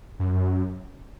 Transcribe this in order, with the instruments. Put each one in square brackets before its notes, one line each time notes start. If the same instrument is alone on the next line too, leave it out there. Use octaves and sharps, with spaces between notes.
[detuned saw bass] F#2